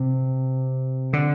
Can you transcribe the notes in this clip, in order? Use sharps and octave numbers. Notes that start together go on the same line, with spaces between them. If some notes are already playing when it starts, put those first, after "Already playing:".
Already playing: C3
D3